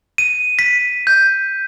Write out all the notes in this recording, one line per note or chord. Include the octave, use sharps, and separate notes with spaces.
D#7
B6
G6